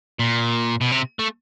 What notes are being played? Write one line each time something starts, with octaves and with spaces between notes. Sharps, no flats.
A#2
B2
C3
A3